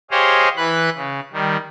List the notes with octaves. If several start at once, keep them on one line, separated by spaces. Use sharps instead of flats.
G4 G#4 C5 C#5 D#5 F5
E3 B4 B5 F#6
C#3
D#3 G3